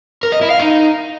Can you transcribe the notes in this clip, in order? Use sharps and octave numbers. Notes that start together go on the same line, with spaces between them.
A#4
D#5
E4
F5
D#4